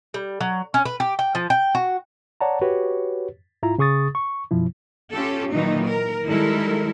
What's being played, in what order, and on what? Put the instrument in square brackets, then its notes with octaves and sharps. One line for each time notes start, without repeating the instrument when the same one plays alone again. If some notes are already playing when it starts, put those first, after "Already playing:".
[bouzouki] G3
F#3
C#4
B4
G4
G5
F3
G5
F#4
[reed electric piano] C#5 D5 F#5 A5 A#5
F#4 G4 B4 C#5
G#2 E4 F4 A#5
C#3 G#4 C#6 D#6 A6
C#6
F#2 B2 F3 E4
[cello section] C#4 F4 G4 A4
A#2 D#3 E3 F#3 D#4
A#4
D#3 G3 G#3 E4 A4 A#4